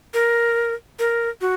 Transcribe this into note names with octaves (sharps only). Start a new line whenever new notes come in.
A#4
A#4
F#4